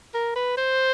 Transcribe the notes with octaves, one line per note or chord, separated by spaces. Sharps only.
A#4
B4
C5